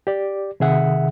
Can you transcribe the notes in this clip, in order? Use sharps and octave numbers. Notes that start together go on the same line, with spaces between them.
G4 D5
C3 D#3 G#4 E5 F#5